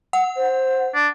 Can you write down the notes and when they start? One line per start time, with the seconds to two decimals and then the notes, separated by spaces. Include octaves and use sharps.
0.13 F#5
0.36 C5
0.95 D4